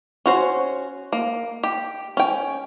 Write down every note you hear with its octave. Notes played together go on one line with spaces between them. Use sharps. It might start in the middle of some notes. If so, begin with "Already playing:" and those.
C#4 F#4 C5
A#3
G4
C#4 G5